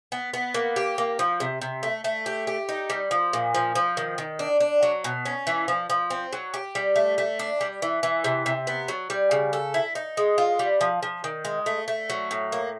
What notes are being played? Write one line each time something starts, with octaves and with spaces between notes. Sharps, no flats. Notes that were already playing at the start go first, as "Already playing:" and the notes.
B3
B3
A#3
G4
A#3
F3
C3
C3
A3
A3
G4
G4
D#4
G3
F3
A#2
F3
F3
D#3
D#3
D4
D4
F#3
B2
C#4
E3
F3
F3
C4
F#3
G4
G3
A3
A3
D4
G3
E3
E3
C3
C3
B3
F#3
G3
C#3
A4
E4
D#4
G#3
F4
G3
F3
F3
D#3
G#3
A3
A3
F#3
A2
A#3